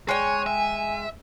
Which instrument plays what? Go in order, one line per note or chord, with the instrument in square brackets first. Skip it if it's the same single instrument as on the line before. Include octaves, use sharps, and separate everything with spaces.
[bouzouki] G#3 G5 [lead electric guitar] C#5 [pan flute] G#5
[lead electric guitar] E5